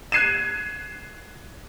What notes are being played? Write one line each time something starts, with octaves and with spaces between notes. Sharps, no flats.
F#6 G#6 C7 D#7 E7